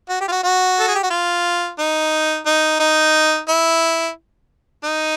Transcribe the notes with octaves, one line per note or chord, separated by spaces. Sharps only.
F#4
G4
F4
F#4
F#4
A4
G#4
G4
F#4
F4
D#4
D#4
D#4
E4
D#4